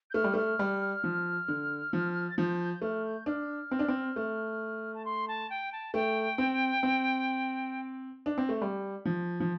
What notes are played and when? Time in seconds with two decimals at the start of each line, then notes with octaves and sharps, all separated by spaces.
0.10 G6
0.14 A3 F6
0.24 G3
0.34 A3 F6
0.59 G3
1.04 F3
1.48 D3
1.93 F3
2.29 A6
2.38 F3 G6
2.60 G6
2.74 G6
2.82 A3 F6
3.05 G6
3.26 D4 F6
3.71 C4
3.79 D4
3.88 C4
4.16 A3
4.94 A5
5.05 C6
5.28 A5
5.50 G5
5.72 A5
5.94 A3 G5
6.38 C4
6.83 C4
8.26 D4
8.38 C4
8.49 A3
8.62 G3
9.05 F3
9.40 F3